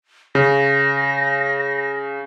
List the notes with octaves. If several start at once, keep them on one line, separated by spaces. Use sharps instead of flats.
C#3 A#6